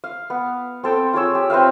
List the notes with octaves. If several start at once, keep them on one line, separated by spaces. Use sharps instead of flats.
F5
B3
C4 A4 G5
F4 G#4 C#5 E6
G4
C4 B4 E5 F5